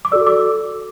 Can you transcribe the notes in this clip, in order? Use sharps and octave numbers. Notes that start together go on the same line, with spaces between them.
D6
F#4 A4 D5 E6
D6